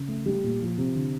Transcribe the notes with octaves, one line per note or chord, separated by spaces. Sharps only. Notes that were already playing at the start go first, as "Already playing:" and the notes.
Already playing: C#3
A3
G3
A#2
F3
C3
D3